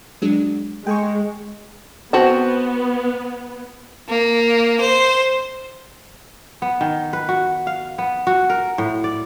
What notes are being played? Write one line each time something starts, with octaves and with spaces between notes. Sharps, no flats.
F#3 G#3 D4
G#3 G5 G#5 C#6
B3 C4 F#4 A5
A#3
C5
B3
D#3
B4
F#4
F5
B3
F#4
A#4
A2
D5